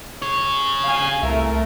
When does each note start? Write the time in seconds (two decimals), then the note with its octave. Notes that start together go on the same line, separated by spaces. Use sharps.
0.22 G#4 C#5
0.83 F5 G#5
1.22 C2 A3 A#4 E5